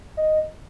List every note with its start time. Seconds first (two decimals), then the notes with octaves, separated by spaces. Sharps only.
0.17 D#5